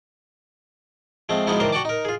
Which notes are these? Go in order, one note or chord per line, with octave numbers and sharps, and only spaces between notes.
F3 G#3 A3 C4
B2 F3 G#3 B3 D#4 E4
D#3 E3 D4 A#4 C5
F#4 D5 F#5 G5 A5 D6
D#4 A#4
F4 G#4